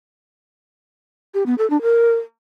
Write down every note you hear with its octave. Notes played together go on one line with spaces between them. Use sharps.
G4
B3
A4
D4
A#4